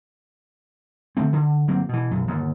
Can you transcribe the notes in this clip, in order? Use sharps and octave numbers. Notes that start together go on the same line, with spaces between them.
D3 F3 A3 C4
D3
G1 F#3 A#3 C4
B2 E3
B1 F#2
G1 D#2